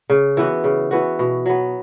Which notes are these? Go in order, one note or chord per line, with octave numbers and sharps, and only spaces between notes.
C#3
E3 B3 F#4
C#3
E3 B3 F#4
B2
F#3 B3